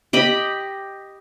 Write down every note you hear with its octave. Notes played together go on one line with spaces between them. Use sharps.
G4 D#5 B5